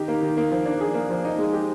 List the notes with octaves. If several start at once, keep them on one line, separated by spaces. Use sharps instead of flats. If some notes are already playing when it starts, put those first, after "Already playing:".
Already playing: D#3 D#4 G4
A#3
D#3
A#3
F3
D4
G#4
A#3
F3
D#4
G#3
G4